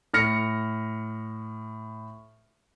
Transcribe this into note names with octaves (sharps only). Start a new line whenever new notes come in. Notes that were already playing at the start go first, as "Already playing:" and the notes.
A2 F6 A#6 C#7